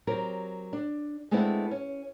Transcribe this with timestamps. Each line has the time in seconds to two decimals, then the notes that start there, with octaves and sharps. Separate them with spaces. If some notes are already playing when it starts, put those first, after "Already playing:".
0.07 F#3 C4 G4 A#4
0.73 D4
1.31 G#3 A3 B3 C4 D4 E4
1.71 C#4